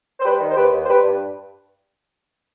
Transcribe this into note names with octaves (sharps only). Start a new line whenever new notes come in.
C5
G3 G4 B4
D#3
C5
D#2 G4 B4
D#2
C5
G3 G4 B4
G2